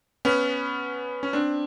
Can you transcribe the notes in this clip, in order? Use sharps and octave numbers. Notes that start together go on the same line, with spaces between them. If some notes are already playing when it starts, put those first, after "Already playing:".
B3 C#4
C#4
C4 D4